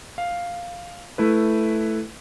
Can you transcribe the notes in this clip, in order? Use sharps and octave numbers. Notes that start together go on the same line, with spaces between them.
F5
A3 E4 B4